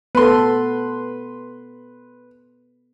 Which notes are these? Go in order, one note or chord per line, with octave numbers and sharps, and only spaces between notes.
B3 A4 B4 C6